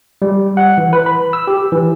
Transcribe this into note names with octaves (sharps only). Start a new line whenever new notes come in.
G3
F#5
E3
B4
B5
E6
G4
E3